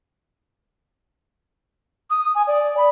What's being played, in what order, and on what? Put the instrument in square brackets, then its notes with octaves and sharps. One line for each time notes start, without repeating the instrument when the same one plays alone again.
[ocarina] D#6
G#5
D5
B5